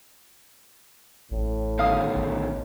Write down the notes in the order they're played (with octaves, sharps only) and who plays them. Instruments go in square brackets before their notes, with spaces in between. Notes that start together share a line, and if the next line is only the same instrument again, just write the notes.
[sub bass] A1 [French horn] A2
[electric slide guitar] B2 D3 D#3 [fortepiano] F5 D#6
[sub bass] A#1